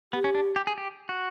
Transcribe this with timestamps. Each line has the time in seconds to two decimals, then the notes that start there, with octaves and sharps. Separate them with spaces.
0.13 B3 G4
0.24 C#4
0.35 D4
0.56 G4
0.67 G#4
0.78 G4
1.09 F#4